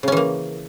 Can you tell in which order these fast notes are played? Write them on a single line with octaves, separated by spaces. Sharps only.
C#3 C#4 E3 A#3